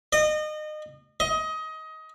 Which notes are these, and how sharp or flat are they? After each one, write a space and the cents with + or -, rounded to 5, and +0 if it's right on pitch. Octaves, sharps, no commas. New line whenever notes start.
D#5 -30
D#5 +20